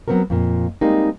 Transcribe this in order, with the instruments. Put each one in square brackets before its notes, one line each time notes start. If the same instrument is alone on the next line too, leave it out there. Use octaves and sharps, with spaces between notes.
[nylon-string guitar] F#3 B3 C4 F#4 A#4
F2 A#2
G3 G#3 A#3 C4 D#4